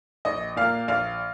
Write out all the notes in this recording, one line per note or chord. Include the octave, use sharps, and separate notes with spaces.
A#1 D#5
A#2 A#3 F5
A#1 F5